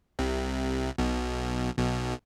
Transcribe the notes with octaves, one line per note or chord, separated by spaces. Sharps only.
C2 C3
B1 B2
B1 B2